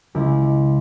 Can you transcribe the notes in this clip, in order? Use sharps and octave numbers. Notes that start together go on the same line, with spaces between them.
C#2 E4